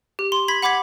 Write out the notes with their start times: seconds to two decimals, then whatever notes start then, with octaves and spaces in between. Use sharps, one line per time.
0.19 G4
0.32 C6
0.48 B5 G#6 B6
0.63 F#5 B5 D6 G#6 B6